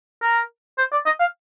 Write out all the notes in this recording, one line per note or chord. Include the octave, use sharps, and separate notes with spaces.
A#4
C5
D5
D#5
F5